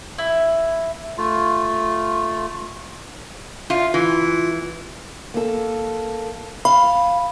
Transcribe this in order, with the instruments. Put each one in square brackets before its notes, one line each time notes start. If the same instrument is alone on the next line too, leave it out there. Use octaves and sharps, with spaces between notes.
[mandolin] E4
[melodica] A3 F4
[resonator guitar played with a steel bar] F4 [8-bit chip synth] E5
[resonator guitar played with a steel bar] E3 [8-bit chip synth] F4
[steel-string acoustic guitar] A#3 A4
[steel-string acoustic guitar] F5 [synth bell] B5